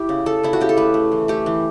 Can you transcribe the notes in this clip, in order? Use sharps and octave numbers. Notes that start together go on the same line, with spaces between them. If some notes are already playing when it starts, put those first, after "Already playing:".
Already playing: E4 G4
C#3
C#3 A4
C#3 E4
F#4
C#3 G4
A4
A3 B4
A3
E3
A3 G4
E3